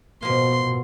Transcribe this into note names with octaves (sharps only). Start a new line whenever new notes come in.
B2 F3 A#3 C6